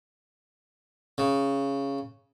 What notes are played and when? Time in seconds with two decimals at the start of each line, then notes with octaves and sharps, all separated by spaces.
1.18 C#3